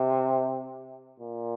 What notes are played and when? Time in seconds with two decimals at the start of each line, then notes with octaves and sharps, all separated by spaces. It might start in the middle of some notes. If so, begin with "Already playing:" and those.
Already playing: C3
1.19 A#2